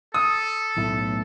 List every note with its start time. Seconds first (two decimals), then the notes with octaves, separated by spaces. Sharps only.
0.14 A4 D#6
0.77 B1 A2 A3